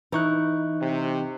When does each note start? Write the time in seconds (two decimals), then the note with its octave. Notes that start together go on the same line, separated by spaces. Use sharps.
0.12 E3 D#4 E4 C#6 F#6
0.81 C3